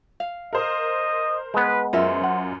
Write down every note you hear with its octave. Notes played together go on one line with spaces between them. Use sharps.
F5
A#4 C5 D#5
G#3 B3 B4
F#2 F4 A#4 C5 E5
F#5